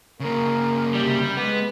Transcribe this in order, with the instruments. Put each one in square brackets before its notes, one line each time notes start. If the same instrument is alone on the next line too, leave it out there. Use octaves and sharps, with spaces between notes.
[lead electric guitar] C#3 A#3 [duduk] A#4
[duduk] C3 [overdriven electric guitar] G3
[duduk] G#3 [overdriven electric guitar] B3